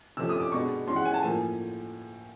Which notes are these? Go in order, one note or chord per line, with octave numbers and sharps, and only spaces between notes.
C3 F3 A3 C#4 E6
D#6
D6
B2 G#3 B3 D4 C#6
E3 G#3 C#4 C6
F#5
G#5
A5
A2 F3 A#3 G#5